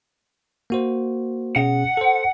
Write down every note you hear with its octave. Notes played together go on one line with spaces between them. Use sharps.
A#3 F#4 C5
B2 C#4 G#4 F#5
A4 C5